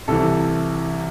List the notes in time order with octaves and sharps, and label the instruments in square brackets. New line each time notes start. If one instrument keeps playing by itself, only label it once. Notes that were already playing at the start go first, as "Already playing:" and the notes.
[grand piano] C2 C3 E3 A4